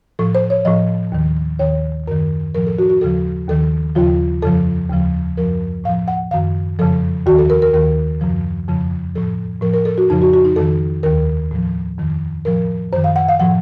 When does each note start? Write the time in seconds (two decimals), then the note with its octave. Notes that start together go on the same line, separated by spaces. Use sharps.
0.19 A2 F3 A4
0.35 C5
0.50 C#5
0.65 A2 F3 D#5
1.12 D#2 D#3
1.59 D#2 D#3 C#5
2.07 F#2 D#3 A#4
2.55 A2 F3 A#4
2.67 A4
2.79 F#4
2.90 F#4
3.01 D#2 C#3 F3 A4
3.49 D#2 D#3 A4
3.95 D#2 C#3 F3 F4
4.42 F2 C#3 F3 A4
4.90 D#2 C#3 F3
5.37 F#2 F3 A#4
5.84 A2 F3 F5
6.08 F#5
6.31 F#2 D#3 F5
6.79 F2 C#3 F3 A4
7.26 D#2 D#3 F#4
7.39 A4
7.50 A#4
7.62 A#4
7.74 D#2 D#3 A#4
8.21 F#2 C#3 F3
8.68 F2 C#3 F3
9.15 A2 F3 A4
9.62 A2 F3 A#4
9.74 A#4
9.85 A4
9.98 F#4
10.10 F2 C#3 F3 D#4
10.22 F#4
10.33 F#4
10.45 D#4
10.56 F2 D#3 A4
11.03 D#2 D#3 A#4
11.51 A2 F3
11.98 F2 D#3
12.45 A2 F3 A#4
12.93 F#2 D#3 C5
13.04 F5
13.16 F#5
13.29 F5
13.40 A2 F3 F#5